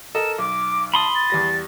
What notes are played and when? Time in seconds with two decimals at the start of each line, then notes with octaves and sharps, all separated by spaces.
0.15 A4 A#4 D#5 E7
0.39 B1 D6
0.94 A5 B5 C6 D#6
1.15 A6
1.30 E2 G3 A#6